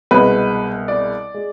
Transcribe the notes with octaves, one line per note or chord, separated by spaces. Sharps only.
C2 B2 G#3 B4
D5
G#3